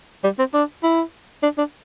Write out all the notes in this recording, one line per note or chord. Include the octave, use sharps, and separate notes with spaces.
G3
C4
D4
E4
D4
D4